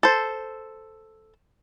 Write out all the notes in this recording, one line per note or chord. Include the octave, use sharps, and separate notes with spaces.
A4 C5